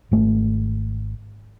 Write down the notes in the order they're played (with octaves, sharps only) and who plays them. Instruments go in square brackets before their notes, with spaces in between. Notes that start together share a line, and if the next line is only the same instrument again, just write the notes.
[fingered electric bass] G#1 A3